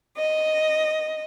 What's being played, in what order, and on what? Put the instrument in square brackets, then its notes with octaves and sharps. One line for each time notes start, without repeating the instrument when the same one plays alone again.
[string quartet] D#5